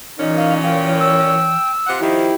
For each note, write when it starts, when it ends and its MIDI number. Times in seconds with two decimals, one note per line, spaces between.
0.19 1.57 42
0.19 1.57 46
0.19 1.56 52
0.19 1.57 61
0.19 0.59 63
0.37 0.54 77
0.63 0.90 77
0.63 1.71 79
1.00 1.88 88
1.87 1.99 48
1.87 1.99 65
1.87 1.99 78
2.01 2.30 51
2.01 2.30 53
2.01 2.35 64
2.01 2.35 67